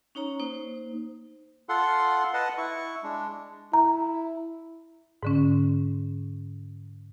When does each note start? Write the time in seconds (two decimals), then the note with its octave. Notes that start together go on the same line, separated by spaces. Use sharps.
0.15 C#4 D#4 C#5 A#5
0.40 A#3 D#4 C5
1.69 F4 A4 F#5 C6
2.34 B4 D#5 F#5 A5
2.58 E4 C#6
3.03 G#3 D4
3.73 E4 A#5
5.23 G#2 D3 C#4